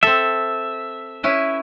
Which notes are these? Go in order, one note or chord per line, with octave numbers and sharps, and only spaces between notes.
C4 A4 E5
C#4 E4 B4